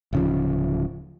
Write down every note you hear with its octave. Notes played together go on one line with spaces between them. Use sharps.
D1 C#3 F3